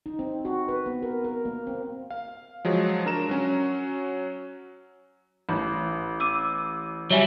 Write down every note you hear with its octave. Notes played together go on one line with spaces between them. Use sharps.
D#4
C4
F#4
B4
B3
A#4
A#4
A#3
C4
F5
F3 F#3 G#3
D4 A#4 A#5 E7
F#3 C#4
A1
D6 E6 D#7
F#3 G3 C#5 E5 G#5